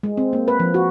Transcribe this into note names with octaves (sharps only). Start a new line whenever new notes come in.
G#3
C4
A#3
B4
F3
F#4